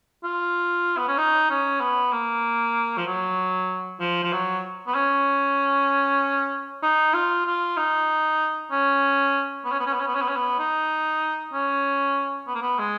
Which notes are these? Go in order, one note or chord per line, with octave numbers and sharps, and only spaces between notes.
F4
B3
C#4
D#4
C#4
B3
A#3
F3
F#3
F3
F3
F#3
B3
C#4
D#4
F4
F4
D#4
C#4
B3
C#4
B3
C#4
B3
C#4
B3
C#4
B3
C#4
B3
D#4
C#4
B3
A#3
B3
G#3